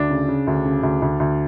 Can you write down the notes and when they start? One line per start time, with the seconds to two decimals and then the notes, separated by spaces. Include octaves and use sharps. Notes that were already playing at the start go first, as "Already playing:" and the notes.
Already playing: D2 D4
0.10 C#3
0.28 C#3
0.47 D2
0.65 C#3
0.83 D2
1.02 D2
1.20 D2